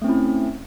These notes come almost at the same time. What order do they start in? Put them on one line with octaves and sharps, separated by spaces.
A3 C4 C#4 E4